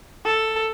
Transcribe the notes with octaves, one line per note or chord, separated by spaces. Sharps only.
A4